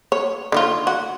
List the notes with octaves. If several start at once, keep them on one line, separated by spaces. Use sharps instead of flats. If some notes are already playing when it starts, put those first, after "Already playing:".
C#5
D3 D#3 F4
F#4